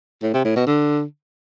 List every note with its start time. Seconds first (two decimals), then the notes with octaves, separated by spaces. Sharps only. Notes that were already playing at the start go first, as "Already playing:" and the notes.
0.22 A2
0.33 C3
0.44 A2
0.56 B2
0.67 D3